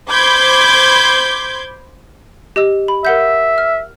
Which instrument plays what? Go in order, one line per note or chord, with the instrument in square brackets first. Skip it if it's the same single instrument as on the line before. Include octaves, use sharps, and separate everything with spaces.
[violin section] C5 B5 C6 D6 G6 G#6
[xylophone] G4 D#5 E6
B5
[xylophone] A#4 F#5 G6 [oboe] E5
[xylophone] F6